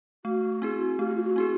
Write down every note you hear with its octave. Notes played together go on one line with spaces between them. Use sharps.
A3 F#4
C4 E4 G#4
A3 G4
F#4
F4
F#4
C4 E4 G#4